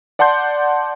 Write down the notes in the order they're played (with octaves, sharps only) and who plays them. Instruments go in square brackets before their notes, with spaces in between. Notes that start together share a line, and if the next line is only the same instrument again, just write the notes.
[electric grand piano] D5 F#5 A5 C6 G6